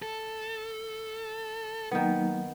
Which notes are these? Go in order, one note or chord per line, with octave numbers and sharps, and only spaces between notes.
A4
D#3 F#3 A#3 B3 D#4